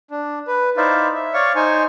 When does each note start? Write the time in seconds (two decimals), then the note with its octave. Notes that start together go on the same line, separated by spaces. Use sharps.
0.11 D4
0.48 B4
0.77 D#4 E4 C5 D5 E5 F5
1.15 E5
1.34 C#5 D5 F5 C#6
1.56 D#4 C5 G#5 C#6